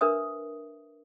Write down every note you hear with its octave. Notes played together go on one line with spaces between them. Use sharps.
D4 A#4 B4 E5 D#6